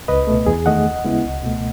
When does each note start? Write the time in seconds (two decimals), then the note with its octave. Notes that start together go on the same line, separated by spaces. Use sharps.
0.08 C#2 B4 D#5
0.27 B2 A3
0.46 E2 G#4
0.66 D#3 A3 D#5 F#5
0.85 D#2
1.05 C#3 G#3 B3 E4
1.24 C#2
1.43 B2 A3